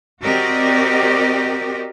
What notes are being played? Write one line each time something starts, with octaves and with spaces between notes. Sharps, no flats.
C4 F#4 G4 A#4 D5 D#5